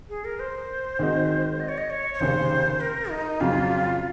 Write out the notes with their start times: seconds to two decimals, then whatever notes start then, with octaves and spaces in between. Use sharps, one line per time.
0.09 G#4
0.24 A#4
0.39 C5
0.99 D#3 G#3 C4 D#4 F#4
1.60 D#5
1.69 C#5
1.78 D#5
1.90 C#5
2.14 C#5
2.20 F1 D#2 C#3 C5
2.80 A#4
3.10 D#4
3.40 F2 C#3 F#3 F4